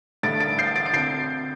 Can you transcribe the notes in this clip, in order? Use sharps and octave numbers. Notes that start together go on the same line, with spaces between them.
G2 D3 A3 D4 A6 D7
A6 D7
G6 C7
A6 D7
D7
D2 D3 C4 G6 C7